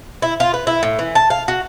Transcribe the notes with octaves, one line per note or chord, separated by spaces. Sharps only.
E4
F4
B4
E4
A2
E3
A5
F5
F#4